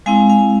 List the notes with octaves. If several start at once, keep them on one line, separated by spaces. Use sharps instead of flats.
G#3 C4 E4 F5 G#5
F5 G#5